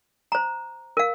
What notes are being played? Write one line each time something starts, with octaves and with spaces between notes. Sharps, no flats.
C5 A#5
A#4 F5